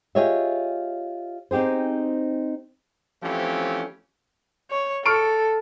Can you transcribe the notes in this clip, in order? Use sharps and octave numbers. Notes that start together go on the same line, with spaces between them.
F4 G4 G#4 C#5 D#5 E5
C4 D#4 G4 G#4 C5
E3 F3 A3 C4 C#4 G4
C#5
A4 C#6 F6 D7